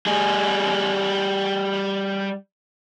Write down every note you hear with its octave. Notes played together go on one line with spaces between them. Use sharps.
G3 G#4